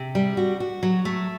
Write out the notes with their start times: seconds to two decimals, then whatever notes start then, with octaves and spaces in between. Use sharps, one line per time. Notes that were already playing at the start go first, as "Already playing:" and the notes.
Already playing: C3
0.15 G3
0.37 F#4
0.60 F#4
0.83 F#3
1.05 A3